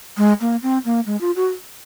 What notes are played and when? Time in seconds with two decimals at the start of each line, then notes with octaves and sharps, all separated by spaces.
0.17 G#3
0.41 A#3
0.63 C4
0.85 A#3
1.06 G#3
1.21 F4
1.36 F#4